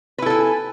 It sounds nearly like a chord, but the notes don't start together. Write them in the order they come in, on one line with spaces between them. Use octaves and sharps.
B4 E4 A4 G#5